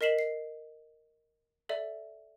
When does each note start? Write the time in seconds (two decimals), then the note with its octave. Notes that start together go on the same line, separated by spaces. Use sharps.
0.01 A#4 D#5 B6 C7 E7 F#7
0.19 C7
1.69 A4 D5 E5